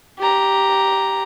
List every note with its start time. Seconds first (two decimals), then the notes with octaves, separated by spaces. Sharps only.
0.19 G4 A#5